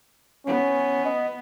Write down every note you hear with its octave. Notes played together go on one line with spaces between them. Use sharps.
B3 C#4
D#5